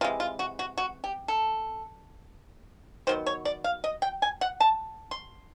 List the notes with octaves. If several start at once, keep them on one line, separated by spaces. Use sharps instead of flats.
C3 E3 G#3 F4
F4
F#4
F#4
F#4
G4
A4
D#3 F#3 B3 C5
C#5
D5
F5
D#5
G5
G#5
F#5
A5
C6